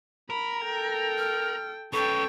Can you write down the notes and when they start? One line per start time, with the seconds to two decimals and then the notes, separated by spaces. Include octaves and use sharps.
0.30 A#4 B5
0.64 A4 G5
1.18 F6
1.93 C#4 A4 B4 G5 C#6